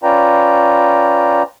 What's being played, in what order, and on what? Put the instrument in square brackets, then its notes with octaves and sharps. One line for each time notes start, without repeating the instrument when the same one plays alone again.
[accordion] C#4 F4 B4 D5 G5 A#5